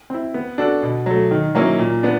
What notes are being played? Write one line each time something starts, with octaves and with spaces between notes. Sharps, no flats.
C4 E4
B3
D4 F#4 A4
B2
F#3 A3
D#3
F#3 A#3 C#4 E4
A#2
B3 D4